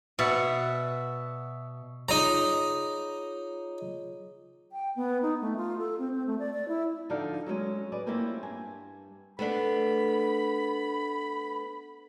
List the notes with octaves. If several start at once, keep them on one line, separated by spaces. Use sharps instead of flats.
B2 D5 E5 F#5
D#4 F4 G#4 C#5 A#5
G5
B3
D#4
A3
F4
A4
C4
C4
A3
D5
D5
E4
D3 F3 D#4 D5 F5
F#3 G#3 C4 C#4
G#4 B4 D5
G3 A#3 C4 C#4 E4 F4
G2 G#5
A3 B3 D4 B5